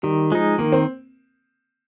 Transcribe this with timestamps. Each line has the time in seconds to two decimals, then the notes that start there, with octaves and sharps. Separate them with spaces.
0.03 D#3 G3
0.32 F3 G#3 D#4
0.58 D#3 A#3
0.72 C4